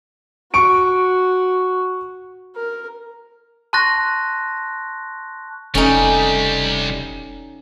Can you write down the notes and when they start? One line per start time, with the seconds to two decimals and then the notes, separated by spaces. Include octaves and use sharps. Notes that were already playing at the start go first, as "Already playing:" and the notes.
0.54 F#4 C#6 D7
2.56 A#4
3.73 A5 C6 C#6 F#6 A6 A#6
5.75 F1 C3 G3 A3 C#4 D#4